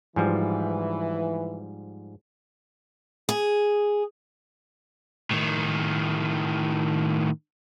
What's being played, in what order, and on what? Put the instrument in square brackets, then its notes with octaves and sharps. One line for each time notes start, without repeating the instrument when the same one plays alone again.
[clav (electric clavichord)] G#2 F3 G3 [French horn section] E3
[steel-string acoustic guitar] G#4
[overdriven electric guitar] A2 D#3